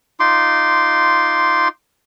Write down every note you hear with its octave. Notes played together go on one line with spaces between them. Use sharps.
D#4 F4 C6 D6